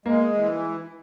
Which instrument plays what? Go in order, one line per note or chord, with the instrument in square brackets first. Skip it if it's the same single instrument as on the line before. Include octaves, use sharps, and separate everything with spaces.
[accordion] G#3 [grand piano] A#3
[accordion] E3